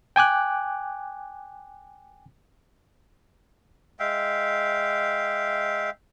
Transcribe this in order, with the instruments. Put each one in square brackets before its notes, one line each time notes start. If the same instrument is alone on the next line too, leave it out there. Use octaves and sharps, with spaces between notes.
[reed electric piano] G5 G#5 D6 F#6
[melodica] G#3 E5 F5 G5